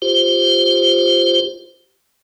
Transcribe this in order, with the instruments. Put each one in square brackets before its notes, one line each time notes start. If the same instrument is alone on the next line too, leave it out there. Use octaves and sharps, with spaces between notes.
[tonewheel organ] F4 G4 C5